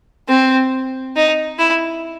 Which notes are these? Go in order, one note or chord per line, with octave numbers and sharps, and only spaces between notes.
C4
D#4
E4